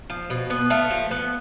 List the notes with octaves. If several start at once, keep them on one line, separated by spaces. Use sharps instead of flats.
F3
B2
B3
A3 F5
F3
B3